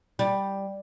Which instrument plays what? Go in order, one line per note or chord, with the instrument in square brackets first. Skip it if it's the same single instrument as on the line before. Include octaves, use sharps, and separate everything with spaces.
[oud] G3